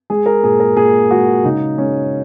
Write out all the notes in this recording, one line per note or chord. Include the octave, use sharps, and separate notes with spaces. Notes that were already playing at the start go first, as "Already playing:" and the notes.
G#3 G#4
A#4
A#2 G#4
A#4
A#2 G#4
G#3 F#4
C#3 D#4
G#3 C#4